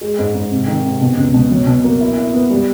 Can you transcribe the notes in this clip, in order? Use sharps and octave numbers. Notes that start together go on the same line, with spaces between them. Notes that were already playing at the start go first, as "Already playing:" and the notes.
G#3
G#2
G#2
C3
D#3
C3
B2
C#2
B2
F#3
B2
A#3
E4
E4
B3
G3